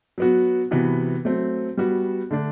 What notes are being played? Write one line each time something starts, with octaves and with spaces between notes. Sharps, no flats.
F#3 B3 F#4
C3 E3 B3 F#4
F#3 A3 C4
G3 B3 F#4
D3 A3 D4